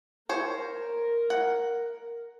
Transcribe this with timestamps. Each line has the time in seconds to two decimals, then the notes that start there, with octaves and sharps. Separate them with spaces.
0.29 A#4 C5 C#5
1.30 F#5